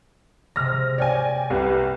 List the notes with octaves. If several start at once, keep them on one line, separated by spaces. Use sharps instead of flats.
C3 G#3 F6 A#6
C#5 D5 G5 G#5
C2 G4 B4